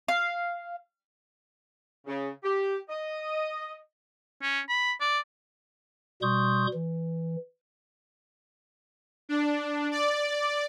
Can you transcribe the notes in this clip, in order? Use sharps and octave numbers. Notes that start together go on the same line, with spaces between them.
F5
C#3
G4
D#5
C#4
B5
D5
B2 G3 C6 C#6 D#6 G6
E3
D4
D5